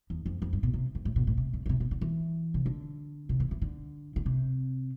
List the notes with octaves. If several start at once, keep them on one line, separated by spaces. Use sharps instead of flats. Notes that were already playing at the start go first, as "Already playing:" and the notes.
E2
F2
F2
G2
B2
C3
F2
A2
B2
A2
C3
D3
D3
C3
B2
D3
E3
C3
D3
C3
E3
E3
D3
D3
C3